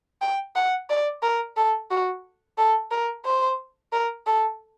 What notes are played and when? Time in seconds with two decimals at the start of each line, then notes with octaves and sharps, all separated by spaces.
0.21 G5
0.56 F#5
0.90 D5
1.22 A#4
1.57 A4
1.91 F#4
2.58 A4
2.91 A#4
3.25 C5
3.92 A#4
4.27 A4